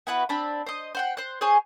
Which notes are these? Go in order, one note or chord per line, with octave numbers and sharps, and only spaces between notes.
B3 E4 F#4 B4
C4 D4 B5
C5 D#5
C5 F#5 G5
C5 F#6
G#4 C5 C#5 G#5